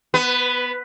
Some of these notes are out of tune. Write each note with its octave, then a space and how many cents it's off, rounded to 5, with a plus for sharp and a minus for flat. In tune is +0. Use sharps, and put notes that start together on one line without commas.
B3 +0 B4 +25